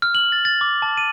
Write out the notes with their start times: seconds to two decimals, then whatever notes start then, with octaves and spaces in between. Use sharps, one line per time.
0.02 F6
0.15 F#7
0.32 A6
0.45 A6
0.61 D6
0.82 A5
0.97 D#7